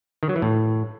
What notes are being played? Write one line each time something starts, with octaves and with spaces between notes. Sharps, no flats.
D#3
F#3
E3
A2